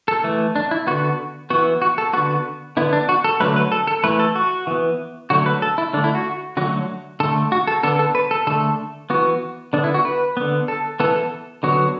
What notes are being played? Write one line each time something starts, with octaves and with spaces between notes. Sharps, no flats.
A4
E3 A3
D4
E4
D3 B3 F#4
E3 B3 F#4
F#4
A4
D3 B3 F#4
D3 B3 E4
D4
F#4
A4
D3 F#3 A3 B4
B4
A4
A4
E3 A3 B4
A4
F#4
E3 B3
D3 F#3 A3 F#4
B4
A4
E4
D3 A3 D4
E4
F#4
D3 F#3 A3 F#4
D3 A3 A4
F#4
A4
D3 B3 A4
A4
B4
A4
D3 A3 A4
E3 B3 F#4
D3 B3 D4
E4
F#4
B4
D3 B3
A4
E3 B3 A4
A4
D3 F#3 B3 F#4